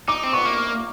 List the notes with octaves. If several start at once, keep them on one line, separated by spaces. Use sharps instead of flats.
D#4 D6
C4
B3 C#6
A#3